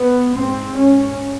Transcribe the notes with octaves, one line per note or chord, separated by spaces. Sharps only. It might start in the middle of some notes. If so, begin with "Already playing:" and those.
Already playing: B3
G#2 C4
C#4